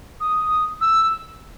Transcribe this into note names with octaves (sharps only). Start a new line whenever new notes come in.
D#6
E6